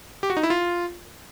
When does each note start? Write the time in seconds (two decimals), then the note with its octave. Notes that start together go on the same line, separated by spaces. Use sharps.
0.23 G4
0.30 F#4
0.37 D#4
0.43 E4
0.50 F4